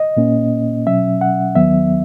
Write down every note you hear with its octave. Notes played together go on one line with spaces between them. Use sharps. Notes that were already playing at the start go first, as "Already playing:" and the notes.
Already playing: D#5
A#2 A#3 C#4
B2 F#3 C#4 E5
F#5
D#2 D#3 F#3 B3 E5